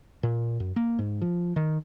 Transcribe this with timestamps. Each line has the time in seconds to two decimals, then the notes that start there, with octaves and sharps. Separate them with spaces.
0.23 A#2
0.60 F#2
0.76 A#3
0.99 G#2
1.21 F3
1.56 D#3